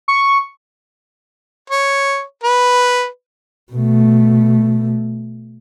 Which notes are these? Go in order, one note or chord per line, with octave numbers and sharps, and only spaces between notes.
C#6
C#5
B4
B2 A3